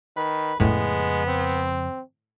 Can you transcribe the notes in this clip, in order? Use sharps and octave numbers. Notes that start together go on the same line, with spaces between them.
D#3 B4
F2 A2 C#3 G#3 B3
C4